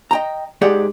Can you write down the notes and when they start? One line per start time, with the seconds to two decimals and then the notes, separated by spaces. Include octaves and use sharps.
0.11 D#5 G5 A#5
0.61 G#2 G4 G#4 D5 F#5